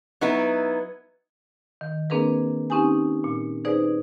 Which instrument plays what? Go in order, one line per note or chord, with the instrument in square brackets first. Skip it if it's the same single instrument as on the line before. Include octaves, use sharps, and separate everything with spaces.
[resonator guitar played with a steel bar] F#3 B3 D#4 E4 B4
[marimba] D#3
A#3 C4 D4 G#4 A#4 B4
C4 C#4 D#4 G4 G#5
A#2
D#4 G#4 B4 C5 D5